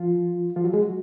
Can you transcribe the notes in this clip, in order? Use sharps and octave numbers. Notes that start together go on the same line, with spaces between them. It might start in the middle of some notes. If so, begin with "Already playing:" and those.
Already playing: F3 F4
F3 F4
F#3 F#4
G#3 G#4
F#3 F#4